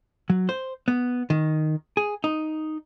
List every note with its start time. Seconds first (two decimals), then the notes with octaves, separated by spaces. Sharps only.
0.30 F#3
0.49 C5
0.88 B3
1.30 D#3
1.97 G#4
2.24 D#4